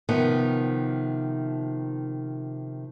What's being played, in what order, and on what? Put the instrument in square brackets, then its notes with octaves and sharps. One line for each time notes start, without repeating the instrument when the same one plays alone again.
[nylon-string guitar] C3 D#3 F3 B3